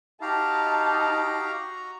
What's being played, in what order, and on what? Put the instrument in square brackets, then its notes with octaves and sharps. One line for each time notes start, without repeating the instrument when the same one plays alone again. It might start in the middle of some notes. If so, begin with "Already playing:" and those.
[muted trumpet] D#4 [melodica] F#4 D#5 A#5 [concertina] G4 F5 [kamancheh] A5